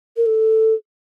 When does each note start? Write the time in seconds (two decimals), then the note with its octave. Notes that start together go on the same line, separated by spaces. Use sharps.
0.16 A#4
0.26 A4